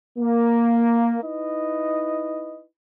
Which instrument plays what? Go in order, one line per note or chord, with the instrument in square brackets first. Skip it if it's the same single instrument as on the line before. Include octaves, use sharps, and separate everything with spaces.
[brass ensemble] A#3
D#4 E4 B4 D#5